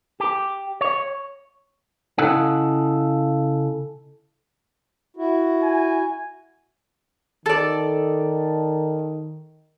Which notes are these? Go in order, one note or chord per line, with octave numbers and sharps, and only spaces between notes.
G4
C#5
C#3 E4 A4 D#5 F#5
E4 F#4
G#5
D#3 A4 D5